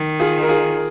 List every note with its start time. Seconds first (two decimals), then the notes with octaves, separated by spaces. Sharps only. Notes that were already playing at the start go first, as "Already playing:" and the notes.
Already playing: D#3
0.20 F4 G#4
0.42 A#4
0.49 F4 G#4